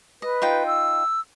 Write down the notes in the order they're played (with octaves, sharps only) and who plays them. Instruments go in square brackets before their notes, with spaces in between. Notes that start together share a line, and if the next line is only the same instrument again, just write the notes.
[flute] B4 [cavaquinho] D#5
[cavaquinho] D#4 F4 G5
[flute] E6